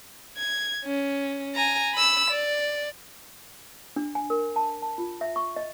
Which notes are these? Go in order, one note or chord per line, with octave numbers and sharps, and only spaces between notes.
G#6
C#4
G#5 A#5
B5 E6
D5
D4
G#5
A#4
A5
A5
F4
E5
C#6
D#5